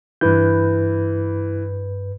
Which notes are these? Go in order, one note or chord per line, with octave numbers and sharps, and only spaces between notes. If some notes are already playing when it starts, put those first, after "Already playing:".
G2 E3 B4 G6